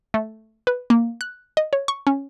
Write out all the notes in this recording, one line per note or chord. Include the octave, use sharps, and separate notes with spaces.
A3
B4
A#3
F#6
D#5
C#5
C#6
C#4